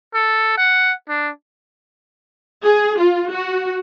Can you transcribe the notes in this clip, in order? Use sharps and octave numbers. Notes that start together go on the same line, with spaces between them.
A4
F#5
D4
G#4
F4
F#4